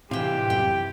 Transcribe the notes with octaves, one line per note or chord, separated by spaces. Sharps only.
A2 C3 E3 G4 F5 G5
F#2 G5